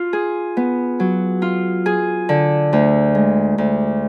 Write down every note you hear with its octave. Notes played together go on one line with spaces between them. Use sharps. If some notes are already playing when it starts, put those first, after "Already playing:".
Already playing: F4
G#4
B3
F#3
F4
G#4
D3
D2
G#3
D2